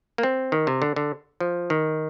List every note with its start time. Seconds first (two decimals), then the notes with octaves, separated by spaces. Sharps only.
0.18 A#3
0.23 C4
0.52 D#3
0.67 C3
0.82 D3
0.96 D3
1.40 F3
1.70 D#3